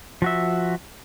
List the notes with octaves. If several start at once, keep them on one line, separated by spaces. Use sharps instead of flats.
F3 F#4 E5